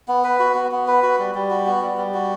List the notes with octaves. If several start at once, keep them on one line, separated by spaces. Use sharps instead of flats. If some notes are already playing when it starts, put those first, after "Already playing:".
B3
B4
F#4
B3
B3
B4
F#4
G3
G3
F#4
B3
G3
G3
F#4